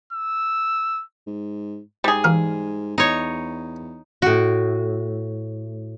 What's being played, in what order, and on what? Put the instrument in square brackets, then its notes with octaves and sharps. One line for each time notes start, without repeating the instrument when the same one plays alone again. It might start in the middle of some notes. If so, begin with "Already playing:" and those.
[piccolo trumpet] E6
[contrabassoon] G#2
[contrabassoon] G#2 [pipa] G3 G#4
[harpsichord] E3 A#4 F5
[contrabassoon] E2 [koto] D#4 C#5
[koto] A2 F#4